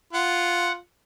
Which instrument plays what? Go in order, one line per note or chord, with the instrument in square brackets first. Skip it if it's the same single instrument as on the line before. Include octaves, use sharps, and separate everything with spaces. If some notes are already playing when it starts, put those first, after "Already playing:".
[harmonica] F4 [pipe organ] F#5